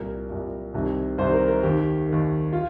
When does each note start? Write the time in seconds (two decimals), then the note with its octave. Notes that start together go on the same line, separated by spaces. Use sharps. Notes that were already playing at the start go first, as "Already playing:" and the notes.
Already playing: C2 A#2 A#4
0.29 C2 A#2
0.73 C2 C3 D#3
1.18 C2 C3 D#3 C5
1.33 A#4
1.48 A#4
1.63 D#2 D#3 G4
2.08 D#2 D#3
2.53 F4